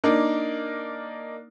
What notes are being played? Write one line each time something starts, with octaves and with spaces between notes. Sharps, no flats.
A#3 D4 D#4 A#4